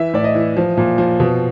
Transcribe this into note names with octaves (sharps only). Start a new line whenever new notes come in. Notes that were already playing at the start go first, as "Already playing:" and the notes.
Already playing: E3 E5
A2 D5
D#5
E3
F3
A#2
F3
B2